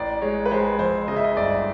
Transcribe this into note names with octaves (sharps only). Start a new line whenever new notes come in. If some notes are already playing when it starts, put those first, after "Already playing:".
Already playing: A1 D5
G#3 C#5
B4
G#3 C5
F2 C5
C#3 D#5
E5
D#5
G1 D5